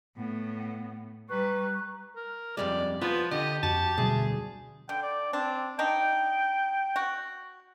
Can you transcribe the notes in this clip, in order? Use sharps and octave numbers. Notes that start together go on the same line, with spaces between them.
A2 B3
G3 B4 A#5 C#6 F#6
A#4
F2 G3 G#3 D5
F3 B3 F4 B4
D3 G4 D#5
F2 F#4 A5
D2 B2 F#3 G3 G#4
D3 G5
D5
C4 D4
D4 D#4 G5
F#4